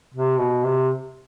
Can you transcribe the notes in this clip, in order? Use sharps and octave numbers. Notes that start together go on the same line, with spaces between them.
C3
B2
C3